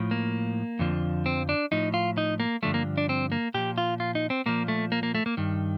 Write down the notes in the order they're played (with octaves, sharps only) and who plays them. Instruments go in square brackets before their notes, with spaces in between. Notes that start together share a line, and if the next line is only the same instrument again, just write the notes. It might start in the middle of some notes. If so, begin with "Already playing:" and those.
Already playing: [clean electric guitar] A2 F3
A#3
F2 D3 F3
C4
D4
A2 F3 D#4
F4
D#4
A#3
G2 D3 F3 A3
A#3
D4
C4
A#3
A#2 F3 G4
F4
F4
D#4
C4
A#2 F3 A#3
A3
A#3
A#3
A3
A#3
G2 D#3